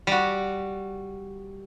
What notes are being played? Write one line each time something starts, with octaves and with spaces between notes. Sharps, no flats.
G3 F#4